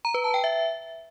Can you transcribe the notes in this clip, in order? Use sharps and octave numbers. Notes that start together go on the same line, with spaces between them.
A#5
B4
A5
G5
E5